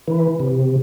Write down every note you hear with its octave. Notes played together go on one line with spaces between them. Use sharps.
E3
C3